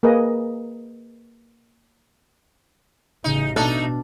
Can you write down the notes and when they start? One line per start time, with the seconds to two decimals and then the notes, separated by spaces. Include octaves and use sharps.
0.03 A#3 G#4 A#4 B4 D#5
3.24 A1 C#3 D#4
3.56 B2 A3 D4 D#4 A4